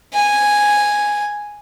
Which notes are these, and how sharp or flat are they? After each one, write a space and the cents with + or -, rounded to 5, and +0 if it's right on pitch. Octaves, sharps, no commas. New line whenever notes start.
G#5 -5